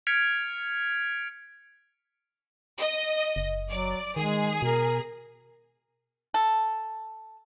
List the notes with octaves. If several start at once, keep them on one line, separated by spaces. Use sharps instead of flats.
F6 G#6 B6 C#7 D7 F7
D#5
F#1
F#3 D5
D#3 G#3 G#4
B2 A#4
A4